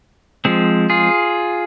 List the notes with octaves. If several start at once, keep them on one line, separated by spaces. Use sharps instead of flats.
F3 G#3 C4
F4 G#4